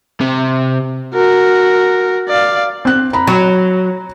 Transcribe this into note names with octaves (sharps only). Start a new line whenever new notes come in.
C3
F#4 A#4
D5 F5
C4 F#6
A#5 B5
F#3